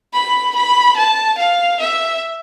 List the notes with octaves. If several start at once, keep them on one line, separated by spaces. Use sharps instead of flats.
B5
B5
A5
F5
E5